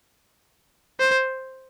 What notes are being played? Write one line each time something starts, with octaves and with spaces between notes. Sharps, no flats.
C5